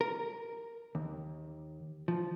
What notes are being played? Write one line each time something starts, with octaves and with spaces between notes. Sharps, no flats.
A#4
D#2
F3